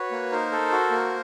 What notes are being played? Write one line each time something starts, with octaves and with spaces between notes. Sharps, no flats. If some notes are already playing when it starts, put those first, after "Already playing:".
Already playing: F#4 B4 C#5
A#3
D#4 A#4 C5
A4
F#4
A#3